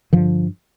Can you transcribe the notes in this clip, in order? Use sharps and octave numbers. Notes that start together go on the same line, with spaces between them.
G2 D3 D#3 F3